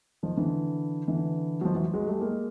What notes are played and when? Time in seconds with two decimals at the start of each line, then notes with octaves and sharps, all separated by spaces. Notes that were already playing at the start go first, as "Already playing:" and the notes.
0.23 D#3 F3
0.37 D3 E3
1.08 D3 E3
1.61 F#3
1.64 D#3 F3
1.75 E3 F#3
1.93 F#3 G#3
2.07 G3 A3
2.21 G#3 A#3